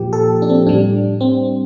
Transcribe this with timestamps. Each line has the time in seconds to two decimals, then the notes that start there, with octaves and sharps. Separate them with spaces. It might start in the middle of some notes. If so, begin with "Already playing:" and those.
Already playing: A#2 F3 G4
0.13 A4
0.42 D4
0.49 C4
0.66 A2 G3 D4
1.21 C4